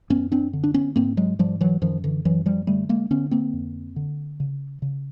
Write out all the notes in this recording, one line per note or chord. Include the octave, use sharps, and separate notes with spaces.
F#2 B3 C#4
C4 D4
D3
D4
B3 C#4
G#2 A#3 C4
F#3 G#3
G#2 F3 G3
E3 F#3
F#2 D#3 F3
D3 E3
F#2 E3 F#3
F3 G3
D3 G3 A3
G#3 A#3
D3 B3 C#4
A#3 C4
F2
D3
C#3
C#3